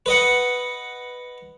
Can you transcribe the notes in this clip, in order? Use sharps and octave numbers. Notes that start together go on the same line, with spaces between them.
B4 D#5 F#5